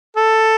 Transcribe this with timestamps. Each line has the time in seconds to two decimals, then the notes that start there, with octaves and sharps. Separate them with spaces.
0.17 A4